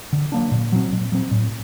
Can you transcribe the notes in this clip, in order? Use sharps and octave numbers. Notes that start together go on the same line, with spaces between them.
D3
F#3 A#3 D4
A#2
F#3 C4
A#2
F#3 C4
A2